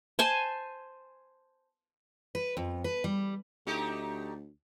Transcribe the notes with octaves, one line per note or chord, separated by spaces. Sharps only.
C5 G#5 A5
B4
F2
B4
G3
D2 A3 D#4 G4